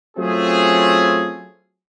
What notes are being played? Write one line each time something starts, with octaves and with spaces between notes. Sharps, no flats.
F#3 A3 C4 C#4 F4 G#4